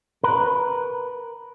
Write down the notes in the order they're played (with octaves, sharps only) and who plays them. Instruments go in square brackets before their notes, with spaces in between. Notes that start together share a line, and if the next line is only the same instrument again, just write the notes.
[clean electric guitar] A#4 B4